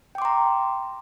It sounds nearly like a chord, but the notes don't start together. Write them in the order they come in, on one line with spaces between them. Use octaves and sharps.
G5 D6 C6 A#5